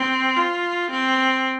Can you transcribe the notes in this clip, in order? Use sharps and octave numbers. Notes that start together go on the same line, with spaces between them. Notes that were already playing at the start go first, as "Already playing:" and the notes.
Already playing: C4
F4
C4